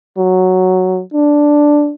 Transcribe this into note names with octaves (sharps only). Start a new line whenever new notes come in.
F#3
D4